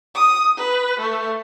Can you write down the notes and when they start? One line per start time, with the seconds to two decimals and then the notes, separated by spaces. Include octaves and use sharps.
0.15 D#6
0.58 B4
1.00 A3